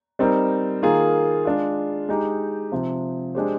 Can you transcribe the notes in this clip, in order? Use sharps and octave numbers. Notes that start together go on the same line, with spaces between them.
G3 C4 D#4 A#4
D#3 A#3 F4 G#4
G#3 D4 F4
G#3 D#4 G4
C3 F3 C4
G#3 D4 G4 C5